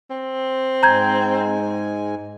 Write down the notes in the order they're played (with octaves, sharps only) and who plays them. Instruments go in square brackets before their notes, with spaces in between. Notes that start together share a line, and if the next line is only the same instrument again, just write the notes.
[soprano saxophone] C4
[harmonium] G#2 G#3 G#5 [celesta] A#5 G6 G#6